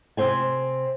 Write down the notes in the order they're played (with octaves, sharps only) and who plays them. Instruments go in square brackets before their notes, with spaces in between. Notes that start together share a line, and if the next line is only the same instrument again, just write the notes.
[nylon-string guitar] C3 C4 C5 G#5